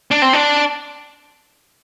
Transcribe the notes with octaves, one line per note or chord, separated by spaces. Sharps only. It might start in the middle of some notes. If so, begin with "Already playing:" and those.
D4
C4
D4